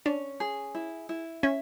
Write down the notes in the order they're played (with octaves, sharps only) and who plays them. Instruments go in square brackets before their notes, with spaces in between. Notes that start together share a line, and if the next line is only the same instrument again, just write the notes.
[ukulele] C#4 [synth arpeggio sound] D4
[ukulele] G#4
E4
E4
[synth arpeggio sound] C#4 [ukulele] E5